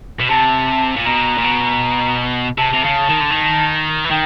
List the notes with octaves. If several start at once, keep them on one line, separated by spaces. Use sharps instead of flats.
B2
C3 A5
A#2
B2 A#5
A#2
B2
C3 A5
C3
C#3
D#3
D3
D#3
E3
D#3 G5